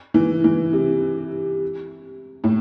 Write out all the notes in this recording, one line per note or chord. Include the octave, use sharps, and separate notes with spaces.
E3
E3
C3
A2